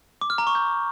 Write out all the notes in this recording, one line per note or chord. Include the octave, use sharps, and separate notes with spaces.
D6
F6
A#5
C#6
G6